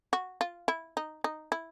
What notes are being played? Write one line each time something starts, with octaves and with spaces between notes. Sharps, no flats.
F#4
F4
E4
D#4
D#4
E4